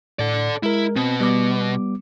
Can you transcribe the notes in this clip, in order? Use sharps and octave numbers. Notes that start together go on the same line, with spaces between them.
A2 A4 D5
G#3 E4 A#4
B2 C4
G3 B3 D6